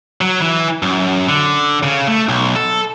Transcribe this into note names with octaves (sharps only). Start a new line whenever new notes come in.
F#3
E3
F#2
D3
C#3
A3
B1
A4